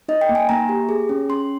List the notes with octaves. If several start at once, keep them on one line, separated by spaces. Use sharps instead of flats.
D#4 D#5
G5
A#3
G#5
A#3 A#5
G4
G#4
C#4
C#4 C6